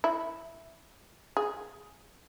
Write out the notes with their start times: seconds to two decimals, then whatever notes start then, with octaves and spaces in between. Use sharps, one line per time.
0.04 E4
1.37 G#4